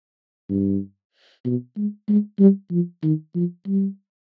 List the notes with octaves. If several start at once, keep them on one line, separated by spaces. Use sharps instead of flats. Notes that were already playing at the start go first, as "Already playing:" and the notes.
G2
B2
G#3
G#3
G3
F3
D#3
F3
G3